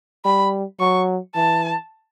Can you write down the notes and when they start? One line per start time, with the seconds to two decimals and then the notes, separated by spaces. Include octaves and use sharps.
0.25 G3 B5
0.80 F#3 C#6
1.36 E3 A5